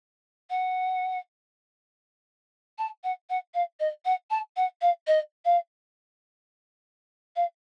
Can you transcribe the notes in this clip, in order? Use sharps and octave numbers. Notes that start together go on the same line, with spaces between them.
F#5
A5
F#5
F#5
F5
D#5
F#5
A5
F#5
F5
D#5
F5
F5